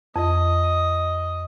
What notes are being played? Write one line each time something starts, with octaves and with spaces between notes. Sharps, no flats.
F2 D#5